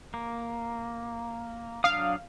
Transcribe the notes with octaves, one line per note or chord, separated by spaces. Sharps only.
A#3
F#3 D4 F5 D#6